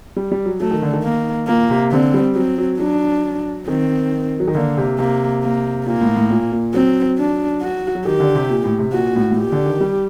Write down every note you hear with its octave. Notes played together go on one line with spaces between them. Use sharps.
G3
G3
F#3
F#3 A3
D#3
D3
D#3
A#3
A#2 A#3
C3
D3 C4
G3
F#3 C4
F#3
F#3 D4
D#3 C4
F#3
D#3
D3 A#3
C3
C3 A#3
A#3
A#2 A#3
A2
A2
A#2
A#2
F#3 C4
D4
F#4
F#3
D#3 G4
D3
C3
A#2
A2
C3
A#2 F#4
A2
A2
A#2 G4
D3
D#3
G3